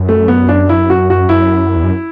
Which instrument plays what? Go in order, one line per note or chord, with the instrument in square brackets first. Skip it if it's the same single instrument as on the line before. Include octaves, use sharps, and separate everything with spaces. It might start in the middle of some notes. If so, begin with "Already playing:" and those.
Already playing: [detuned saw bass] F#2
[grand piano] A3
B3
D4
E4
F#4
F#4
[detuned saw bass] F#2 [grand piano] E4
[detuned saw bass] E2
F#2